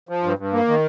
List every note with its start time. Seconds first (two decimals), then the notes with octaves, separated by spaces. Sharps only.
0.09 F3
0.24 G2
0.38 G2
0.53 A#3
0.68 D#3